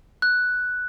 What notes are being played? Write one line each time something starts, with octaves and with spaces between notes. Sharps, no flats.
F#6